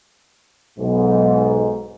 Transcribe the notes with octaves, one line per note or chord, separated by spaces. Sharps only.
B1 G#2